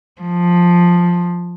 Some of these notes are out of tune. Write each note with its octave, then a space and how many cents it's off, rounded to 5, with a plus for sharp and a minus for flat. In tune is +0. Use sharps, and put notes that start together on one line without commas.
F3 +5